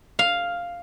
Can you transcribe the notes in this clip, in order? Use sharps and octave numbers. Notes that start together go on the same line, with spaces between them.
F5